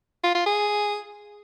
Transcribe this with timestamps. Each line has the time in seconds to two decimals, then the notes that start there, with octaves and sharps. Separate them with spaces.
0.24 F4
0.35 F4
0.46 G#4